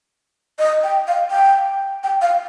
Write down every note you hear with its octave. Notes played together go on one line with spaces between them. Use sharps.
D#5
G5
F5
G5
G5
F5